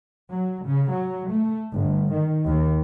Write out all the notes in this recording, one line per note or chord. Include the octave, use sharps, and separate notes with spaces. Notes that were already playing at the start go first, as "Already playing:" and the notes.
F#3
C#3
F#3
A3
G1
D#3
D#2